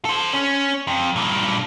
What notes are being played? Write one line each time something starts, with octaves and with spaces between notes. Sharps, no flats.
A4 C5
C#4
F2
G2 A#2